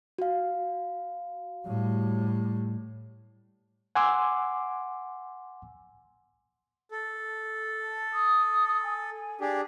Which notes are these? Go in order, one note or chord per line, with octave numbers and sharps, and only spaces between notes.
F#4 F5
A2 G3
F#5 G#5 C6 D6 E6
A4
D#6
G#5
D4 G4 G#4